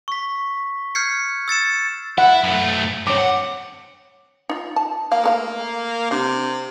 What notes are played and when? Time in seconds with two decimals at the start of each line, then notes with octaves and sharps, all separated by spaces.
0.08 C#6 B6
0.95 F6 G6 G#6 C7 C#7
1.48 E6 A6 C#7 E7
2.18 E4 F#5
2.44 F#2 A3
3.07 G2 C4 C#5 D6
3.18 F#5
4.49 D#4 F4
4.76 A5
5.12 A#3 F5
5.24 A3 A#4 F5
6.11 C3 D4